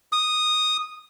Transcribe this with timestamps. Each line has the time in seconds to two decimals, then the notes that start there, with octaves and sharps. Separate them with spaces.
0.12 D#6